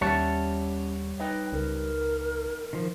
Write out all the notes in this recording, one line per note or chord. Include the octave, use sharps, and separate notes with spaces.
D#2 G3 C#4 C#5 E5 F#5 A5
D#4 B4 D#5 G5
C#2 A#4
D#3 F3